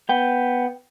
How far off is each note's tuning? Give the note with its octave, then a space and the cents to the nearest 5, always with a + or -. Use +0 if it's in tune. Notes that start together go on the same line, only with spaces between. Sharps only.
B3 +0 G5 +0